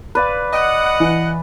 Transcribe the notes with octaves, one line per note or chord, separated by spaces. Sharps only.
B4 D5 F5
D#5 F#5
E3